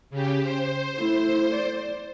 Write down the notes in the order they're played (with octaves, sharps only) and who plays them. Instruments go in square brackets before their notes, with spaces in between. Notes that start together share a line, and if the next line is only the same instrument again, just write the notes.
[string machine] C#3 G4
C5
[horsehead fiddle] A3 E4
D5